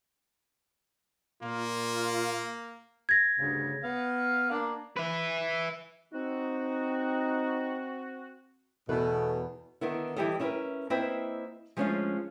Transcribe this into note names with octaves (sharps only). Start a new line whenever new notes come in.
A#2 A#3 F4
G#6 A#6
D2 G2 C#3
B3 F5
A#3 D4
B4 E5
C4 D#4 F#4
E2 B2 A3 B4
D3 D#3 B3 E4
E3 G3 E4 G4 A4 D#5
C#4 E4 G4 G#4 A#4 B4
A#3 C4 E4 B4 D#5 E5
F3 G#3 A3 C#4 D4 F4